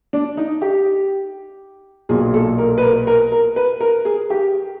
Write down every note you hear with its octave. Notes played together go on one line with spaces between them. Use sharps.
D4
D#4
G4
B1 A#2 G#4
A4
A#4
B4
A#4
A#4
A#4
B4
A#4
G#4
G4